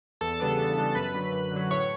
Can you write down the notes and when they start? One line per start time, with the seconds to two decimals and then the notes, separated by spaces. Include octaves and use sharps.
0.21 E2 A4 A5
0.40 C#3 G3 B3 D4
0.58 E2
0.76 C#3 G3 B3 D4
0.95 F#2 B4 B5
1.14 D3 F#3
1.32 F#2
1.51 D3 F#3
1.71 A2 C#5 C#6